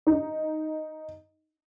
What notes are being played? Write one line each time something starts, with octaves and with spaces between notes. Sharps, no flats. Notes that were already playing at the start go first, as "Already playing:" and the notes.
D#4